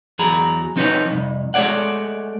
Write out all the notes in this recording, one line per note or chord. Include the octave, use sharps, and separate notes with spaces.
E2 F#3 G#4 A#5 B5
F3 C4 D#4 A4 B4 C#5
C2 F2
G#3 A3 G4 C#5 D5 F#5